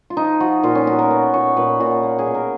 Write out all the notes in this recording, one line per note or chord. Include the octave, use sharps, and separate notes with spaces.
F4
F3 D#4
F3 F#4
A#2 F4
C#4
B3 F#4
A#4
B3
A#2 C#5
A#2 B4
A#2 F#4
A#3
G#4
B2
A#4